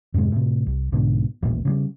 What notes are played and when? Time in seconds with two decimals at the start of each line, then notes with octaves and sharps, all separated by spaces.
0.14 F2 G#2 C3 G#3
0.32 A2 C3
0.66 C2
0.92 B1 G#2 B2 D3
1.42 D#1 A1 A#2
1.65 C#3 F3 G3